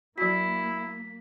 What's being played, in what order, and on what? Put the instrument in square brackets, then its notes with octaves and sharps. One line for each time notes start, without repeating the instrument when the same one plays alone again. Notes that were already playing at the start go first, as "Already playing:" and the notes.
[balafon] F#3 F#4 [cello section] A#3 [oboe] E4 [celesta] B6